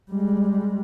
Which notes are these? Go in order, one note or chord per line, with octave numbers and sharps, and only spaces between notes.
G3 G#3